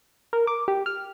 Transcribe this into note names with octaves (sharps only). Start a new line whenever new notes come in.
A#4
D6
G4
F6